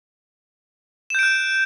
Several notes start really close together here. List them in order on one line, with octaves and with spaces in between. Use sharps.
E7 G6 D7 F#6